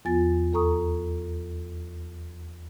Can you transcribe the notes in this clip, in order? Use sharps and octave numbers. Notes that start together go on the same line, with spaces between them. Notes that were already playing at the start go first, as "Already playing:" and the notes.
E2 F3 B3 F4 G#5 A6
D#2 A4 A#5 C#6 D#6